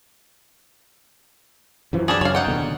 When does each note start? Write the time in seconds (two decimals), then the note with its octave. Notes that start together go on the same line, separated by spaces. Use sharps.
1.93 F#2 E3 F3
2.08 G3 D4 G#4
2.21 F#2 C#3 F#3 C#5 F5
2.35 D#4 F#5 G5
2.47 D#2 B2 D3